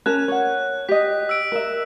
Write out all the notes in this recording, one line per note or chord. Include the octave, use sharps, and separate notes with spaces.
C#4 A#4 A5 F#6
C#5 F#5
G4 D#5 B6
E6 D7
A#4 E5